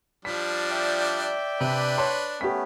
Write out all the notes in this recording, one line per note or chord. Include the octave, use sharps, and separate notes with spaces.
F3 G3 D4 B6
D5 E5 G5
C3 D4 B4
C#5 A5 C6
A3 B3 C#4 G4 B6